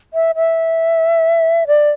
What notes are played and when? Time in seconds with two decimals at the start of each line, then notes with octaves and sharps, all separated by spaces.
0.14 E5
0.36 E5
1.67 D5